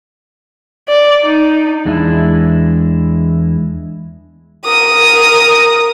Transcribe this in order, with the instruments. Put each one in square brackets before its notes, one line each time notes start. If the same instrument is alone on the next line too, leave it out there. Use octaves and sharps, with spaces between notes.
[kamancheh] D5
D#4
[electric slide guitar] E2 G#3 D4 E4
[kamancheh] A#4 D#6